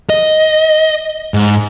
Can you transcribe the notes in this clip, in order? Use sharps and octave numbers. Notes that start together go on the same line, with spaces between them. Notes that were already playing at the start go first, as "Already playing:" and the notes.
D#5
G#2